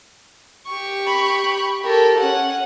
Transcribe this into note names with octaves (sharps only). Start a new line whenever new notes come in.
G4 C#6
B5
G4 A4 A#4
C#4 F#5